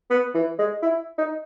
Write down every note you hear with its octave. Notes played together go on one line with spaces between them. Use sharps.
B3
E3
G#3
E4
D#4